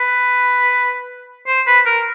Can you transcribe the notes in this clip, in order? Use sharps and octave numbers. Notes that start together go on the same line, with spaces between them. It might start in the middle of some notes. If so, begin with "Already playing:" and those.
Already playing: B4
C5
B4
A#4